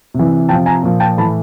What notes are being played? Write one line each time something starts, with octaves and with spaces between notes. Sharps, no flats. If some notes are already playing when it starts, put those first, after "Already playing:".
C3 E3
C3 F3 G5 A5
G#5 A#5
A#2 F3
G5 A5
A2 E3 A5 B5